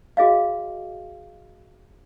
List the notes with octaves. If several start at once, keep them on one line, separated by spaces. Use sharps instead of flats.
F#4 G#4 D#5 F5